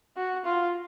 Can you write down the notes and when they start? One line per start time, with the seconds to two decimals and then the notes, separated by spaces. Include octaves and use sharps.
0.17 F#4
0.45 F4